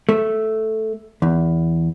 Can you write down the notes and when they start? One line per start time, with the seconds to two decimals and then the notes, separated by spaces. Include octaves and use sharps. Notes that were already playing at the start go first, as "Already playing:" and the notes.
0.09 A3
1.22 E2